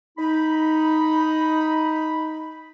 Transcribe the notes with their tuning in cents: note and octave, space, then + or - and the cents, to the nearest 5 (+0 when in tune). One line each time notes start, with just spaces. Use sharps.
D#4 +10 B5 +0